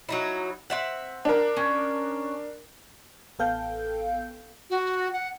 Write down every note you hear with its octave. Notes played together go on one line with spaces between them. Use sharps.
F#3 D#4 E4
C4 E5 F#5
D4 A#4
C#4
A1 B3 A4 F5 G5 G6
F#4
F#5